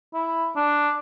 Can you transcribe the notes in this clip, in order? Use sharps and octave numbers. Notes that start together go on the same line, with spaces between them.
E4
D4